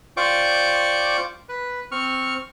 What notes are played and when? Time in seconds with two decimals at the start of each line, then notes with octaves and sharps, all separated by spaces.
0.17 F4 C5 D5 G5 C#6 D6
1.49 B4
1.92 C4 C#6 F6